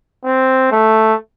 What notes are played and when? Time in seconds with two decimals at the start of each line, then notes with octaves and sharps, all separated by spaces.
0.25 C4
0.72 A3